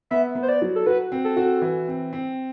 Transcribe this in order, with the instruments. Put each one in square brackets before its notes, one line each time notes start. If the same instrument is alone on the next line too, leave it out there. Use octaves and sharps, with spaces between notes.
[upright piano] B3 [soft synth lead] E5
[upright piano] B3
[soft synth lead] C5
D5
[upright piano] F#3
[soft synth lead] A4
[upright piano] F#4 [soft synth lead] B4
[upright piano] C4
[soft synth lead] A4
[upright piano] F#4
E3
C4
C4